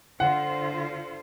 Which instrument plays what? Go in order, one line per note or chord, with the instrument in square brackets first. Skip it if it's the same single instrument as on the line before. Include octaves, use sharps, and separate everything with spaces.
[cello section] D3 F4 C5 [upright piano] F#5